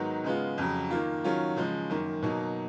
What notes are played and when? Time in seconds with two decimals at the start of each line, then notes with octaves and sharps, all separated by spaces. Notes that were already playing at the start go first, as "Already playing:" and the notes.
Already playing: G#2 D#3 F#3 B3 D#4
0.24 C#3 G#3 B3 F4
0.58 F2 C#3 F#3
0.91 D#3 A#3 F4
1.24 D#3 F#3 C#4 F4
1.56 C#3 F3 G#3
1.90 F#2 D#3 A#3
2.22 B2 F#3 A#3 D#4